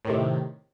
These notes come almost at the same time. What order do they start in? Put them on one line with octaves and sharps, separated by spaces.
A2 D#3 C3